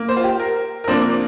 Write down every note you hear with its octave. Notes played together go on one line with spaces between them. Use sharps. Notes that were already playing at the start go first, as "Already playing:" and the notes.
Already playing: A#3
C5
F4
G4
A#4
A#4
C3 F3 A#3 D4 C5